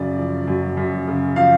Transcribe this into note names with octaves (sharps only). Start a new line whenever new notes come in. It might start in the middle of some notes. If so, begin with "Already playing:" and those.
Already playing: F#2 C#3 D5
F3
F#2
F#2
C#3
F3 F5